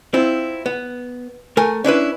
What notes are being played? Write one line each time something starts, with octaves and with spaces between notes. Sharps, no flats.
C4 E4 F4
B3
A3 A#4 G#5
C#4 D4 E4 B4